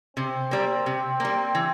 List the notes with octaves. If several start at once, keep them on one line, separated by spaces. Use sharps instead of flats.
C3 C4
G3 A#3
C3
G3 A#3
E3